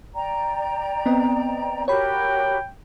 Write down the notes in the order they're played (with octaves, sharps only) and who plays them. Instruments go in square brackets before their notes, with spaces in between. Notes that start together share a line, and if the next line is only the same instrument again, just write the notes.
[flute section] D5 G5 A#5
[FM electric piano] B3 C4 D#5
[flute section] F#4 G4 A#4 [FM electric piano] C#5 B5 [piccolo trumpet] G5